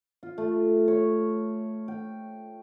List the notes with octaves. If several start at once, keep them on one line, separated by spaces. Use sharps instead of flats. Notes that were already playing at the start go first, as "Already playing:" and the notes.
F4
A3
C#5
G5